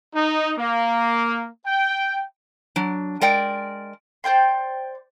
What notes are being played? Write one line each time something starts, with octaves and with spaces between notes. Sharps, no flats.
D#4
A#3
G5
F#3 D4
G#3 A#4 D5 G5
C5 D5 G5 C6